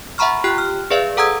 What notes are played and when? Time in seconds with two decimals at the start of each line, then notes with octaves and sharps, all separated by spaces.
0.18 E5 F#5 A#5 B5 C#6 F6
0.44 F4 G4 G5 F#6
0.58 F6
0.90 G#4 B4 D5 E5 F5
1.17 A4 F#5 A#5 D#6 E6 G#6